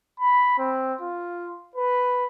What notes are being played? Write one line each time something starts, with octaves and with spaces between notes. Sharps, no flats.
B5
C4
F4
B4